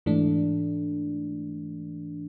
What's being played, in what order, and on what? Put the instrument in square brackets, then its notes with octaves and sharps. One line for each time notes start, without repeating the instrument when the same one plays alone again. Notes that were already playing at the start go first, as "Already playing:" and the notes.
[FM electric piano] G#2 E3 A3 D4